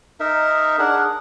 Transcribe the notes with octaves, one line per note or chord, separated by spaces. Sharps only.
D#4 A#4 E5
D4 G#4 A#4 F#5